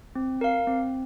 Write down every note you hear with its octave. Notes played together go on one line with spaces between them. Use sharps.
C4
A#4 F5
C4